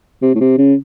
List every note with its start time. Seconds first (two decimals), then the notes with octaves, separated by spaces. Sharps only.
0.22 C3
0.35 A2
0.40 C3
0.58 C#3